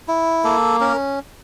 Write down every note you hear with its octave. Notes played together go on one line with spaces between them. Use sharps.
E4
A#3 A4
C#4 A#4